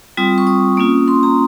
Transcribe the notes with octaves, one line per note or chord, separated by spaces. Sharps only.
G3 C4 F4 D#6
C#6
D#6
A#3 C#4 F4 D#6
C6
A#5